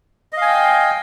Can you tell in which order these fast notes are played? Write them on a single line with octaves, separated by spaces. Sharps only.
D#5 F5 G#5 G5